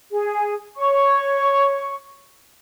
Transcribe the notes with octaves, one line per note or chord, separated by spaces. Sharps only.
G#4
C#5 C#6